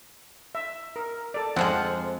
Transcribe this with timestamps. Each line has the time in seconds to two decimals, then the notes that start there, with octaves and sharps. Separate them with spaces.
0.55 E5
0.96 A#4
1.34 A4 D5
1.56 F2 F3 G#3 C4 F#5